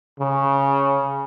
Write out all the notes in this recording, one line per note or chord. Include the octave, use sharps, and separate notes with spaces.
C#3